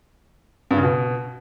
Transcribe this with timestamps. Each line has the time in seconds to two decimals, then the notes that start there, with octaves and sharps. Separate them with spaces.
0.71 G2
0.77 C#3
0.83 B2